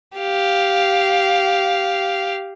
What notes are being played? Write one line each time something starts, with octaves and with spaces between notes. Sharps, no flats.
G4 F5